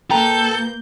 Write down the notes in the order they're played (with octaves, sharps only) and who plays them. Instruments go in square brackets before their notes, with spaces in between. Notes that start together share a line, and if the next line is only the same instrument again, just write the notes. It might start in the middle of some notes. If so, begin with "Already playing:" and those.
[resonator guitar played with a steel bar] A#2 B4 A#5 [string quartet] A#3 G6 [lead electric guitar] A4 [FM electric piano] G5